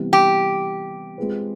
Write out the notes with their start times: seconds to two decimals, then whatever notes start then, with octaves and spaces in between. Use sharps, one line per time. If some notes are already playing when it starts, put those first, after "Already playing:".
Already playing: C3 E3 G3 B3
0.13 G4
1.18 G#3 C4 F4 G#4 B4